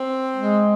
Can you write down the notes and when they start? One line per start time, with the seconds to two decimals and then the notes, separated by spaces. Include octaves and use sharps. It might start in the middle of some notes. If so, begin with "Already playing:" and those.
Already playing: C4
0.36 G#3